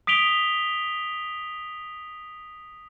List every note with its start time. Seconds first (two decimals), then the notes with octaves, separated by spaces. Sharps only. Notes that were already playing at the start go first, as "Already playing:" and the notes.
0.07 D#6 B6 D7 F7 G7